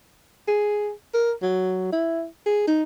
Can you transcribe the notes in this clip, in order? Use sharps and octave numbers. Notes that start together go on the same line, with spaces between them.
G#4
A#4
F#3
E4
G#4
D#4